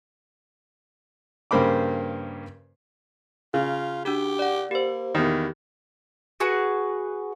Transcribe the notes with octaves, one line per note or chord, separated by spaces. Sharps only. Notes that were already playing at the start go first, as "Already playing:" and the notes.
G2 C#3 A#3 C5 B5 D6
C#3 F4
D4 F#4 G4
D5 F#5
A#3 G4 C5
E2 D#3 G4
F#4 G#4 B4 F#5